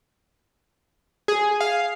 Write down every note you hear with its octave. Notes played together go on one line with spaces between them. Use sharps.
G#4
F5